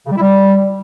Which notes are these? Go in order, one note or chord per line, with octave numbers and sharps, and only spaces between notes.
C#3
G3
E4
G3